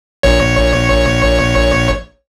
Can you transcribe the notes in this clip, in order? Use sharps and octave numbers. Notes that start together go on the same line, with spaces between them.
A#1 C#5